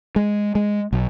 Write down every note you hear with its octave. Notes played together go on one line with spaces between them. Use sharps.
G#3
G#3
B1